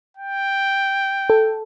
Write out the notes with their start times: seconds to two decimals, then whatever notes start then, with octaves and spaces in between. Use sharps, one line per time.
0.17 G5
1.30 A4